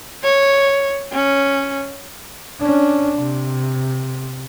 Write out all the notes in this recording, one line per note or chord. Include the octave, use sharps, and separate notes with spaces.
C#5
C#4
C#4 D4
C3